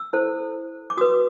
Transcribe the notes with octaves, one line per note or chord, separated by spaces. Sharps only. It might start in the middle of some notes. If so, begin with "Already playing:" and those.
Already playing: E6
E4 A4 C5
D6
F#4 B4 D#6